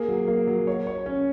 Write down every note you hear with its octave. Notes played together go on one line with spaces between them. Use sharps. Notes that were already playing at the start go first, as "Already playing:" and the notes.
Already playing: A#3 G#4
F#3
A#3
F#3
C#5
C#5
C#4